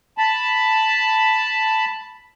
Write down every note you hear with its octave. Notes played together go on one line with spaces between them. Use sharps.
A5 B5